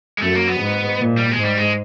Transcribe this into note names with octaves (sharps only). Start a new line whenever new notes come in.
G#3
F#2 A3
A#3
B3
G#2
A#2
G3
G#3
G#2
G3
G#3